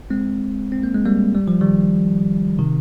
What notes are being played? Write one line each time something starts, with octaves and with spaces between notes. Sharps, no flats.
G#3 C4
C4
A#3
G#3
G3 A#3
G3
F3
D#3 G3
C3 D#3